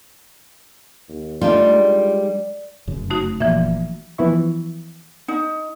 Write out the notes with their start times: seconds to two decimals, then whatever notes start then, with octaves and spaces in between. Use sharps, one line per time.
1.09 D#2
1.41 G3 A3 D4 D#4 F4
1.72 G#3
2.87 F1 F#2 C#3
3.10 A3 D#4 F#4
3.40 F#1 A#2 E3 F3 E5
4.18 E3 F3 B3 E4 E5 C#6
5.28 D#4